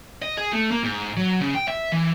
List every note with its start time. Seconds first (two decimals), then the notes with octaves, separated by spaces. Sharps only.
0.22 D#5
0.38 G#4
0.53 A3
0.71 A#3
0.83 G#2
1.17 F#3
1.41 C#3
1.55 G5
1.68 E5
1.92 E3